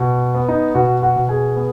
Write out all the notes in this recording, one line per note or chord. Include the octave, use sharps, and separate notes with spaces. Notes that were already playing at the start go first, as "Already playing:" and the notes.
Already playing: B2
B3
D#4 D#5
B2 F#4 F#5
F#4 F#5
B2
G#4 G#5
B3